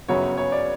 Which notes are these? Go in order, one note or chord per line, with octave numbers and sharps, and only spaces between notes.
G1 F#2 C#3 F#3 B3 C#5
C#5
D5